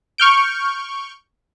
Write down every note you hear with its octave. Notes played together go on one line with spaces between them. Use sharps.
C#6 F6 G6 D7